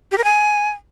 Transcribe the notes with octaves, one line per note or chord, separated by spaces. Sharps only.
G4
A#4
G#5